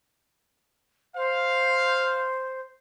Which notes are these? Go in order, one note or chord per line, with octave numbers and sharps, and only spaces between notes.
C5 F5